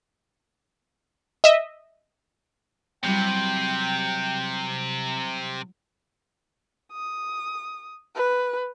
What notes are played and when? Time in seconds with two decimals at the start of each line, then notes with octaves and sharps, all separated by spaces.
1.44 D#5 E5
3.04 C3 F#3 G3 E4 G5
6.92 D#6
8.15 B4